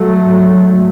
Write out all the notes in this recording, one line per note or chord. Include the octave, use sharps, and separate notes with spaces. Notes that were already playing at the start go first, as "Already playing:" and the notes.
Already playing: F#3 A3
G#2